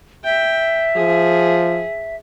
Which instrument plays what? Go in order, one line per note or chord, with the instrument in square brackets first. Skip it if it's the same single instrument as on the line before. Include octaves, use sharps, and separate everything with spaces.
[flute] E5 [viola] G5
[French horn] F3 [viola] G#4